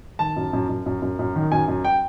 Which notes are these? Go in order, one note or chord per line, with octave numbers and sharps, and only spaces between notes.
D#3 A5
F#2
F#2
F#2
F#2
F#2
F#2
D#3
F#2 G#5
F#2
G5